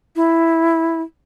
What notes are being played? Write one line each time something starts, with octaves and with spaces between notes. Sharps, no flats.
E4